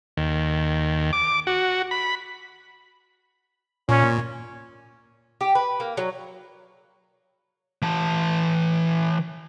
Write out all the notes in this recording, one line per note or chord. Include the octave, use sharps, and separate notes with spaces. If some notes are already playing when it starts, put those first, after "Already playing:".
D#2
D6
F#4
B5
A#2 C#4
G4
B4
A#3
F#3
E3 A5